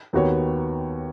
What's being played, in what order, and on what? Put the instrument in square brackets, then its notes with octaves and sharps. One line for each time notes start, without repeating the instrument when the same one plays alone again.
[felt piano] D#2 D#3 B3 F#4 C#5